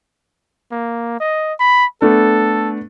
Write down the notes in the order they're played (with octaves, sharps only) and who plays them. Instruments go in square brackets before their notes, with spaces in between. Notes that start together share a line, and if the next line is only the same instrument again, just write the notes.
[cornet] A#3
D#5
B5
[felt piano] A3 B3 D4 [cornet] A4